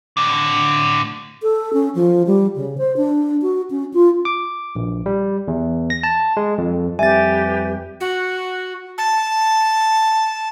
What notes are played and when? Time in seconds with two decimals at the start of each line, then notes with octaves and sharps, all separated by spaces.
0.17 A2 D3
1.42 A4
1.73 C#4
1.95 F3
2.27 G3
2.56 C#3
2.78 C5
2.97 D4
3.42 F#4
3.71 C#4
3.94 F4
4.25 D6
4.75 A#1
5.06 G3
5.48 E2
5.90 A#6
6.03 A5
6.37 G#3
6.58 F2
6.99 F2 G3 G4 B4 E5 G#5 A6
8.00 F#4
8.98 A5